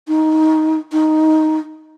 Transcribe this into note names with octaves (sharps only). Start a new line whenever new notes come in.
D#4
D#4